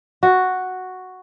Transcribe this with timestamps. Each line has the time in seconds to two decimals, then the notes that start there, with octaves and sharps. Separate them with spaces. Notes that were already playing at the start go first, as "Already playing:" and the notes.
0.23 F#4